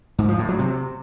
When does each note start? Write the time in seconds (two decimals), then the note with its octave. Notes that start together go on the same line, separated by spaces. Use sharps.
0.18 G#2
0.29 F3
0.39 A2
0.49 F#3
0.59 C3